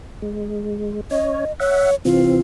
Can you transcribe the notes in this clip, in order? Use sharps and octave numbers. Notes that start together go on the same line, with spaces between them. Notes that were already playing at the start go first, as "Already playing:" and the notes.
G#3
C#4 C#5 D#5
C#5 E5 F#5
C3 E3 C4 F4